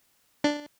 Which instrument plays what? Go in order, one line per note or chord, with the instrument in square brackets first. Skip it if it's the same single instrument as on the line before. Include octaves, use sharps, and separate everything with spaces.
[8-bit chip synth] D4